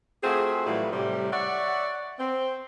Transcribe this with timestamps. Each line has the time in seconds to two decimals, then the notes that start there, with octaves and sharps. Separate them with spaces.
0.23 A3 C4 F4 F#4 G#4
0.66 A2 E3 F#3 G3 A3 F4
0.92 A2 C3 G3
1.32 C#5 D5 E5 F#5
2.19 C4